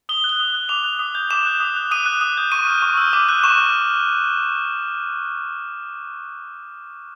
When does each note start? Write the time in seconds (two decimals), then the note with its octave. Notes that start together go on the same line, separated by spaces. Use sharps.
0.09 D#6 G7
0.24 F#6
0.29 G7
0.40 D#6
0.54 F#6
0.69 D6 F7
0.84 F#6
0.99 D#6
1.15 G6
1.31 D6 E7
1.46 F#6
1.60 D#6
1.77 F#6
1.91 D#6 D#7
2.06 F#6
2.21 D#6
2.37 G6
2.52 C#6 D#7
2.67 F6
2.82 C#6
2.97 E6 G6
3.13 D6
3.29 F#6
3.44 C#6 E7
3.58 F6